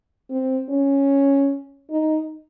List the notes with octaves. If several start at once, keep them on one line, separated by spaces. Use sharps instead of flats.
C4
C#4
D#4